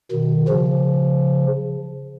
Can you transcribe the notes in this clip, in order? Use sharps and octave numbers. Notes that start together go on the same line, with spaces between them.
B2 D#3
C#3 F3